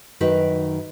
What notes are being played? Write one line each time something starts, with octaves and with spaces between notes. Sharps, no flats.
F#2 D#3 D#4 F#4 B4